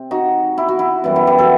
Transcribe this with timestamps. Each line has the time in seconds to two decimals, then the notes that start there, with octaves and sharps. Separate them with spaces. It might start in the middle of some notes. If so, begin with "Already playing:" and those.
Already playing: C3 C4
0.11 D#4 F#4
0.58 E4
0.69 F#4
0.79 E4
1.04 F#2 E3 G3 B3 E4
1.16 E4
1.27 E4 G4
1.39 F#4 A4